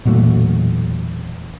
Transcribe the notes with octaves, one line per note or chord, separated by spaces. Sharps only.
E1 A#2 F#3 A3